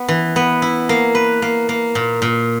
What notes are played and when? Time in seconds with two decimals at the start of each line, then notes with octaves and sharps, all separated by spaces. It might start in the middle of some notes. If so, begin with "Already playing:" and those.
Already playing: B3
0.08 E3
0.36 B3
0.62 E4
0.89 A#3
1.15 B4
1.42 A#3
1.69 A#3
1.95 A#2
2.22 A#2